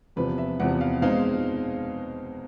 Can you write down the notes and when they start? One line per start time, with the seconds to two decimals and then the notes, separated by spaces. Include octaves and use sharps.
0.16 E2 C3 F3 B4
0.38 E5
0.60 E2 C3 F3 F#5
0.81 F5
1.02 B2 G#3 C4 D#4 F5